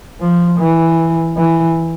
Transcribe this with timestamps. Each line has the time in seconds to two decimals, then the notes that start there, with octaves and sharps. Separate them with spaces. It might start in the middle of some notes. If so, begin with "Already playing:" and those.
0.21 F3
0.59 E3
1.37 E3